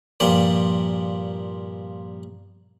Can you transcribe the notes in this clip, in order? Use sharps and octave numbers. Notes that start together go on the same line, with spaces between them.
G2 A#2 F3 D5